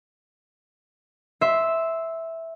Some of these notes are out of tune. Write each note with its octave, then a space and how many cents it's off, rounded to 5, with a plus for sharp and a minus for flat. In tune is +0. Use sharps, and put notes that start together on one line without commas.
E5 -5 C6 +0